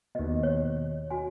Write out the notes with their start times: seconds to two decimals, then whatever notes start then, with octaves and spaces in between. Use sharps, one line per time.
0.15 D#2 B2 D#5
0.43 C#5
1.11 F#4 G#5